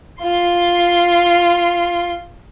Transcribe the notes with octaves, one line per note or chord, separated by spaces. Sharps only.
F4 C6